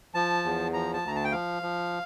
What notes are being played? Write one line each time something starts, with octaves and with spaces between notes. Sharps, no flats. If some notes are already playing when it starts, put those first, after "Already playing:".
F3 A5
E2
F3 A#5
A5
D2 A#5
A5
G5
F3 F5
F3